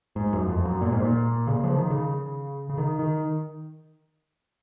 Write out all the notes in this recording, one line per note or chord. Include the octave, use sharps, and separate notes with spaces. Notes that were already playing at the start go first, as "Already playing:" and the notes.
G#2
F#2
F2
F#2
A#2
G#2
A#2
C#3
F3
D#3
C#3
C#3
D#3
D#3